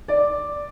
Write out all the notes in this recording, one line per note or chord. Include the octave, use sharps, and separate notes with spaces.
D5